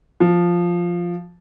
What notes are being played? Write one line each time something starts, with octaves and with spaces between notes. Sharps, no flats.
F3